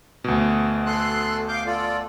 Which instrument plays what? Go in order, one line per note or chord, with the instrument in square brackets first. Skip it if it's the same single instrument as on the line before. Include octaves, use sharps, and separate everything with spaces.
[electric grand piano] D2 B2
[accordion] A4 C6 F#6
F5 D6 G6
F4 A4 D5